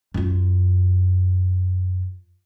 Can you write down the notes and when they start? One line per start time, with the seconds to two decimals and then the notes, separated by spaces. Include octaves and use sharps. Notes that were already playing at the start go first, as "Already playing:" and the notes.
0.14 F#2 F4